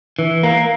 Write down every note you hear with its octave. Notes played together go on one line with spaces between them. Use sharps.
E3
A#3